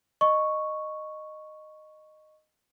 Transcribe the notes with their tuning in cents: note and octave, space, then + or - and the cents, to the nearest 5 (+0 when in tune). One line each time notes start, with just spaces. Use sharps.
D#5 -15 C#6 +0